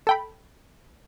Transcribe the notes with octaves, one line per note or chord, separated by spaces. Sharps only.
A4 G5 B5